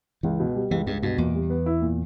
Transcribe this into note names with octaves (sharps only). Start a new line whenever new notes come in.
C#2 E3
B2
G3
C#2 E3
C#2 G2
G2 B2
E2 A#2
G3
B3
E4
A#2